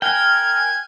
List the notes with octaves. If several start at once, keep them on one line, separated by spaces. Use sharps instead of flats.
A#4 G5 G#5 F6 F#6 G#6